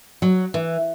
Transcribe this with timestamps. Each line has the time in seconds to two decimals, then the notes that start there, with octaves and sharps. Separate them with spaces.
0.22 F#3
0.54 E3